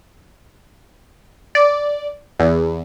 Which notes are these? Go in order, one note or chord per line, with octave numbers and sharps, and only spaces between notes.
D5
E2